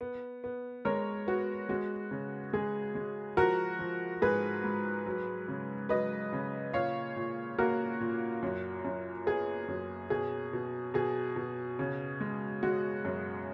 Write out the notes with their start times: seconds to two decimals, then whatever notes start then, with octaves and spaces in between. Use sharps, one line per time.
0.01 B3
0.44 B3
0.85 G#3 A#4 C#5
1.27 B3 F#4
1.69 G#3 F#4
2.11 C#3
2.53 G#3 G#4
2.95 G#3
3.37 F3 F#4 A#4
3.79 F3
4.22 G#2 G#4 B4
4.64 G#2
5.06 F#3
5.48 C#3
5.89 F#3 B4 D#5
6.33 C#3
6.73 A#2 C#5 F5
7.16 A#2
7.58 A#3 F#4 A#4
8.00 A#2
8.43 F#2
8.84 F#2
9.26 B3 G#4
9.68 F#2
10.10 B2 G#4
10.53 B2
10.94 B2 G#4
11.36 B2
11.79 C#3
12.21 G#3
12.63 G#3 F#4
13.05 F#2